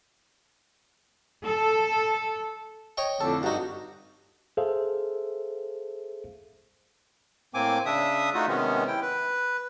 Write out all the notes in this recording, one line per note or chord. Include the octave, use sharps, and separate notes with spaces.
A4
C#5 D#5 G5
F2 A2 D3 A4
G2 D#4 F#4
G#4 A4 C5 E5 F5
A2 A#3 C4 G#5 D6
C#3 D4 E5 D#6
A3 D#4 F4 F#4
C3 D#3 G#3 B3 C#4
E4 G5
B4